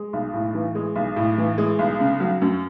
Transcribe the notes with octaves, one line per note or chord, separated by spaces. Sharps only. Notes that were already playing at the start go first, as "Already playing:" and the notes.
Already playing: G#3
B1
A2
E3
G#3
B1
A2
E3
G#3
B1
C#3
F#3
F#2